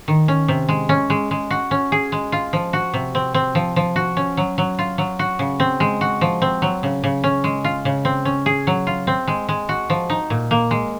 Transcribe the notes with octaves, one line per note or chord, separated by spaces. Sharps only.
D#3
C#4
C3
G#3
C#4
G#3
G#3
F#4
C#4
G#4
G#3
F4
F3
F#4
C3
C4
C4
F3
F3
F#4
C#4
F#3
F#3
F4
F#3
F#4
C#3
C4
G#3
F#4
F3
C4
F#3
C#3
C#3
C#4
G#3
F4
C#3
C4
C#4
G#4
F#3
F4
C4
G#3
G#3
F#4
F3
D#4
A#2
A#3
G#3